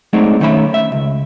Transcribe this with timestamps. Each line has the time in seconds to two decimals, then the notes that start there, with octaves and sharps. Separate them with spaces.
0.13 F#3 G#3 A3 C4 D4 D#4
0.40 B1 D#3 A3 C#4 E5 B5
0.74 E5
0.92 C#2